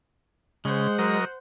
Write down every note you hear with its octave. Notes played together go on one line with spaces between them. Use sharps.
C#3 G#3 C5 F#5
F#3 A#4 D#5